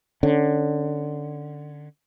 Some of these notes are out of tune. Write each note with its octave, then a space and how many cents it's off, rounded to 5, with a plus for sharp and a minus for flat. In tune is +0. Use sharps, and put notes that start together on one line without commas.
D3 +15 C#4 +0